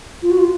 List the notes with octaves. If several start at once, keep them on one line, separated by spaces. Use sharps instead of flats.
F4
F#4
F4